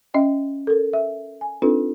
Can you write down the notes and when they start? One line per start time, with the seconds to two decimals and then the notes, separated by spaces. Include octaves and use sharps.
0.14 C#4 D#5 E5 G5
0.67 A4 A#4
0.93 E5
1.41 G#5
1.62 C4 D4 D#4 F4 A4 B4